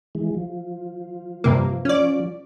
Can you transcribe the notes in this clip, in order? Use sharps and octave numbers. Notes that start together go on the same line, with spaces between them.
E3 G#3
F3
G2 C3 A#3
C#4 D5